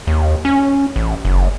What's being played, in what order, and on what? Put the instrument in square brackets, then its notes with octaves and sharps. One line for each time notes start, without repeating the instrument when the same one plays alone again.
[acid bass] D#2
C#4
A1
F#1